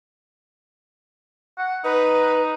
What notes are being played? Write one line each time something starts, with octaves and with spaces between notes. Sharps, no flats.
F#5
D#4 B4